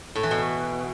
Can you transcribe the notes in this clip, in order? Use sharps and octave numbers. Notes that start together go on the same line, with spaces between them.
A2
E3
B2